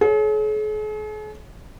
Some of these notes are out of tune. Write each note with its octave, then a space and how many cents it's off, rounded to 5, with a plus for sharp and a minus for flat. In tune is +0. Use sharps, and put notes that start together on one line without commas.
G#4 +45 C#5 +0